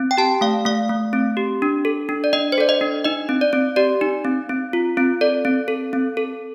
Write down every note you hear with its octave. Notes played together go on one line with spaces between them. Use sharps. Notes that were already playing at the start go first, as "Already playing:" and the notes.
Already playing: C4
G5
G4 A5
A3 F5
A3 F5
A3
C4
G4
D4
A4
D4
D5
D4 D#5
C5
A4 D5
D#5
D4
D#4 D#5
C4
D5
C4
G4 D5
D#4
C4
C4
F4
C4
A4 D5
C4
A4
C4
A4